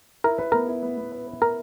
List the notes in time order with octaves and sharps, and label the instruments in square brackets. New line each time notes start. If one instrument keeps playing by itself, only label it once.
[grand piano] E4 [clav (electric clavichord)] A#4
[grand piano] B4
[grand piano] B3 [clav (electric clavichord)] A#4
[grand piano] E4
B3
B3
B4
B4
[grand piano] B3 [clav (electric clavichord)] A#4